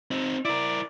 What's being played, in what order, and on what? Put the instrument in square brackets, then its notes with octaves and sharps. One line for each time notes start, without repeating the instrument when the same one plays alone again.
[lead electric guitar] C4 D#4
[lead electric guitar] E4 A#4 [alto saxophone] D5